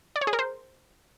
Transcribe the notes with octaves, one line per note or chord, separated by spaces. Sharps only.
D5
C#5
G#4
A#4
C5